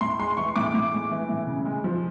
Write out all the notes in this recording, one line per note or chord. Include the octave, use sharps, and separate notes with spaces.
A2 C6
G#3 C6
E3 C#6
A2 D6
A2
G#3
E3
A2
C#3
G#3
F3